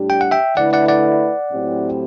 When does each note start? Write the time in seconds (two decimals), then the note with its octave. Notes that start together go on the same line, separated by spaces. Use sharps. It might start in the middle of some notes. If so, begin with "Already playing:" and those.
Already playing: A2 G3 D4 G4
0.10 G5
0.21 F#5
0.31 E5 G5
0.57 D3 A3 E4 B4 D5 F#5
0.73 D5 F#5
0.88 D5 F#5
1.52 A2 F#3 C4 E4 G4